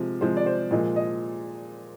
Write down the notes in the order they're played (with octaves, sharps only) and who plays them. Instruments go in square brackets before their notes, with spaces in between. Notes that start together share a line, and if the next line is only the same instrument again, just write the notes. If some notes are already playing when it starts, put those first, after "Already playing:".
Already playing: [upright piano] C3 F3 G#3
C3 F3 G#3 C5
D5
C5
A#2 F3 G#3 D#5
D#5